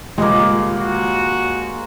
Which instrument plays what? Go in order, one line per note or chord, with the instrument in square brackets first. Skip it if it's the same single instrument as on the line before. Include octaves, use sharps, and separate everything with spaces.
[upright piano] D#1 C#2 D#5 [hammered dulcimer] G#3 A#3
[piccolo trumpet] F#4